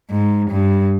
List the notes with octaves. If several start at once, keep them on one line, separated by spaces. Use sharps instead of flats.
G#2
G2